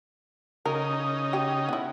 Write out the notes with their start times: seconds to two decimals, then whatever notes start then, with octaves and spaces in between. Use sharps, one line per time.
0.66 C#3 D#4 A#4
1.33 G4
1.69 B3 E4